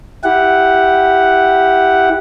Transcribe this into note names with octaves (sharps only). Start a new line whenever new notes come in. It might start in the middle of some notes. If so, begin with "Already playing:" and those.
E4 G4 F#5